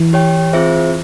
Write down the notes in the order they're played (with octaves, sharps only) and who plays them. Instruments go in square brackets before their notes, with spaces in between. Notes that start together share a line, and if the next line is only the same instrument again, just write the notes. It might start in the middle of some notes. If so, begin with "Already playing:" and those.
Already playing: [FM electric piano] E3
[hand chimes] G4 C#5 G5
C4 F4 G#4 C5 E5